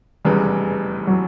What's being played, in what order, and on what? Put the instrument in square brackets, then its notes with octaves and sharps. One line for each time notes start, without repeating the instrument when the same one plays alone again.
[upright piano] F1 E2 C#3 E3 G#3 [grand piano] G3
[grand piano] F#3